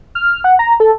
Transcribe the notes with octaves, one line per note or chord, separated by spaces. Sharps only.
F6
F#5
A#5
A4